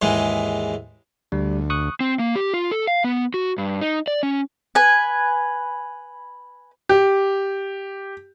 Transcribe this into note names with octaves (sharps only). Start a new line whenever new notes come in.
D#2 G#2 E3 G#3
D2 G3
C#6 D#6 F#6
C4
A#3
G4
F4
A4
F5
B3
F#4
G2
D#4
D5
C#4
B4 G#5
G4